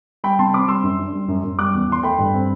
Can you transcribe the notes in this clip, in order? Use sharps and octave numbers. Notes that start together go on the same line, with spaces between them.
G3 G5 B5
C3 A5 C6
C4 B5 D6
G3 C6 E6
F#2
D4
G3
F#2
F#2
G3 D6 F#6
E2
E2 C6
A3 G5 B5
G2
C4